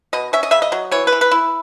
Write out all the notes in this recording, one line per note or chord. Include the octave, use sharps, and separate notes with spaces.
B2 D#5
C#4 E5
D#5
C#3 E5
D#5
F#3
E3 C#5
B4
E3
B4
E4